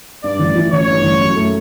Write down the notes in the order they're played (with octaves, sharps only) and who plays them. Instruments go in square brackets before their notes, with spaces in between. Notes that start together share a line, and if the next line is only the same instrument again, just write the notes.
[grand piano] G2 [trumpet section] D5
[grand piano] A1
E3
[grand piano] A1 [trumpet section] C#5
[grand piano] G2
A1
F#2
A3